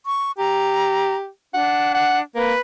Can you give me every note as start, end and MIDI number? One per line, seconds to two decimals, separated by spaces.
0.06 0.32 85
0.38 1.27 67
0.38 1.15 82
1.54 2.22 62
1.54 1.93 78
1.94 2.19 78
2.35 2.53 58
2.35 2.60 71